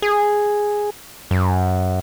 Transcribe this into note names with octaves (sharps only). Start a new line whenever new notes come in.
G#4
F#2